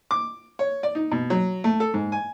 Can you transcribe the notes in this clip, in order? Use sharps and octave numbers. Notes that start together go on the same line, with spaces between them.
D6
C#5
D5
D#4
B2
F#3
A3
A4
G#2
G#5